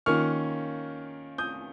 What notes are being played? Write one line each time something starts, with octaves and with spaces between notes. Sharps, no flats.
D#3 A#3 C#4 F4 C#6 F6
D#6 G6